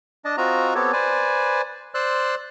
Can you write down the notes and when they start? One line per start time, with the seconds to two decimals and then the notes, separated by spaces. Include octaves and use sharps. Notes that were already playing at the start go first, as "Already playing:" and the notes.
0.25 D4 D#5 A5
0.37 C4 F4 F#4 D#5 A#5
0.75 B3 C4 G4 A4 C#5
0.93 B4 C5 D5 G#5
1.95 C5 D5 C6 E6 F#6